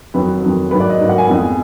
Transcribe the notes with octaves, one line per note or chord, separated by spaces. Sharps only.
F2 D#3 F#3 B4
F2 D#3 F#3
G#2 F#3 A#3 B4
D5
D#5
G#2 F#3 A#3
F#5
G#5
F2 F3 G#3 B3